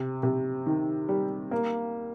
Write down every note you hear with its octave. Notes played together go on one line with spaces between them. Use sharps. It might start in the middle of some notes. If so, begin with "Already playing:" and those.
Already playing: C3
C3
D#3
G3
A#3